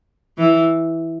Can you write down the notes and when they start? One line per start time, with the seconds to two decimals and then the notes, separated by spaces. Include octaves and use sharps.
0.38 E3